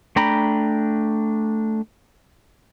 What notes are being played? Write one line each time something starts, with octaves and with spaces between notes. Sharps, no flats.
A3 D4 G5 A#5 B5